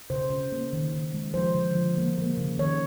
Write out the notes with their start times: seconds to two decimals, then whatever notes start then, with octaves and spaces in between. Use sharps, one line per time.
0.10 C#3 C5
0.30 C#3
0.52 A#3
0.73 D#3
0.94 D#3
1.14 G#3
1.34 F3 C5
1.55 D3
1.76 F3
1.97 A#3
2.18 A#3
2.37 C#3
2.58 D#3 C#5